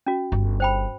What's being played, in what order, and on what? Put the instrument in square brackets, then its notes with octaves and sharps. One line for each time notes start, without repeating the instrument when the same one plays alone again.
[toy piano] C#4 F#4
[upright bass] G1
[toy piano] C5 G5 B5